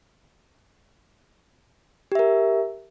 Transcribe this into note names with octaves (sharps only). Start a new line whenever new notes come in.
G4 A#4 E5